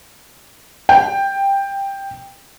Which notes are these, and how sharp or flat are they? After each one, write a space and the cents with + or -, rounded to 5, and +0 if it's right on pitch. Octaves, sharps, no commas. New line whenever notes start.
G5 +10